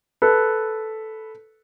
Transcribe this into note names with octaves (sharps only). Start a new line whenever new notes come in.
A4 B4